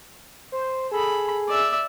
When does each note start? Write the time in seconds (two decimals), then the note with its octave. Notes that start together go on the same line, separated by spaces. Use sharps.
0.52 C5
0.92 G#4 A4 B5
1.49 D5 E5